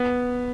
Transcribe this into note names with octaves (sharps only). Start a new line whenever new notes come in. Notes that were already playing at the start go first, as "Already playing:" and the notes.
Already playing: B3